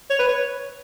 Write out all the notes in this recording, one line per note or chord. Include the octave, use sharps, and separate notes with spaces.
C#5
B4
C#5